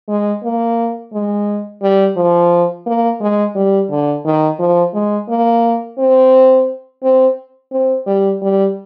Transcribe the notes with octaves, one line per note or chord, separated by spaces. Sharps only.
G#3
A#3
G#3
G3
F3
A#3
G#3
G3
D3
D#3
F3
G#3
A#3
C4
C4
C4
G3
G3